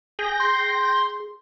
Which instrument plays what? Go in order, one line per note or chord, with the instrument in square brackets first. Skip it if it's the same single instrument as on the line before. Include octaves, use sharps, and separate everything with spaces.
[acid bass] G#4 [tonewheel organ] G5 G6 A#6
[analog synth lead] C6